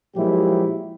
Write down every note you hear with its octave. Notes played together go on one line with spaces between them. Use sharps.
A#2 F3 F#3 G#3 E4 G4